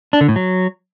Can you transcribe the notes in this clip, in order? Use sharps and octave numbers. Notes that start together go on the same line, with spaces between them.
D4
D3
A2
F#3